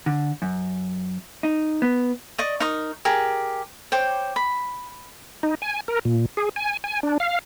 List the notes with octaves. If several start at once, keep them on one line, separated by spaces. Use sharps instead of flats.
D3
F#2
D#4
B3
D5 D#5 C#6
D#4 A#4 C#6 D#6
G4 G#4 A#4
C5 C#5 G5 D6
B5
D#4
G#5
A#4
A#2
G#4
G#5
G#5
D4
F5